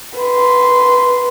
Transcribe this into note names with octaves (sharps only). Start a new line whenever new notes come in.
B4 C6